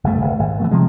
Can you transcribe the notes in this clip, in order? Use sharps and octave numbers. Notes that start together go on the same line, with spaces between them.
F#1 G2 A3
D1
G#1
E3 G#3 A3
C3 F3 G#3